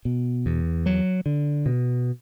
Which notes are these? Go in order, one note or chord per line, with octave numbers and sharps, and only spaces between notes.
B2
E2
F#3
D3
B2